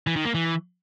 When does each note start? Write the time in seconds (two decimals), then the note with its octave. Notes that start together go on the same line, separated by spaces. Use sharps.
0.07 E3
0.16 D#3
0.25 A#3
0.34 E3